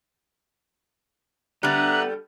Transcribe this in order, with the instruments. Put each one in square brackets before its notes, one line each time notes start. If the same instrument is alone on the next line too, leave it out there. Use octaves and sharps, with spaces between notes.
[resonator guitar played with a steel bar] D3 G3 [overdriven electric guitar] B3 [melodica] D5 E5 A#5 [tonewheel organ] F#6